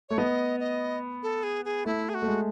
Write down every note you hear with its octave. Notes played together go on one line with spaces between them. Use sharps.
A3 C#5
B3 D#5
D#5
A4
G#4
G#4
A3 E4
G#4
F#4
A3
G#3